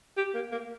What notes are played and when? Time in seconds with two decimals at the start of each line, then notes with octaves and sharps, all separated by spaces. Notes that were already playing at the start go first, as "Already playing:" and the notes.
0.17 G4
0.35 A#3
0.52 A#3